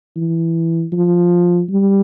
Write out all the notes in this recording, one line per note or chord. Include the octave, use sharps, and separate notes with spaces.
E3
F3
G3